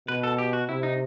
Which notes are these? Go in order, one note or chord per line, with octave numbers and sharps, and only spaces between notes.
B2 B4
A4
G4
F#4
C3 E4
D#4